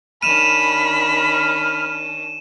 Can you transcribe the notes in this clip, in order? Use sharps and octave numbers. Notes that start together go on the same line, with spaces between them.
D#3 C#4 D4 B5 F6 D#7 E7